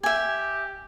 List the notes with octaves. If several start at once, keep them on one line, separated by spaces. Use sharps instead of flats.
G4 E5 G#5